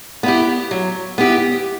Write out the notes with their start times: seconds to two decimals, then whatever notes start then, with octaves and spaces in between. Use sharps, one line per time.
0.23 B3 E4 G4
0.71 F#3
1.18 B3 E4 G4